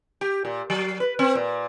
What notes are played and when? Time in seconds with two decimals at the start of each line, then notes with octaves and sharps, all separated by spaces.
0.21 G4
0.45 A#2
0.70 F#3
1.00 B4
1.19 C4
1.35 A#2